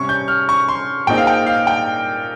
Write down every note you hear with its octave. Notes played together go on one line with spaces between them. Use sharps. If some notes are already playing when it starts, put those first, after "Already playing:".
Already playing: C3 G3 C#4 C#6
G6
F6
C#6
C6
A#2 G#3 C4 D#4 G5
F5
G5
F5
G5